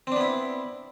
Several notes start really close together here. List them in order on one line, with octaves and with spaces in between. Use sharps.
C4 D4 B3 E4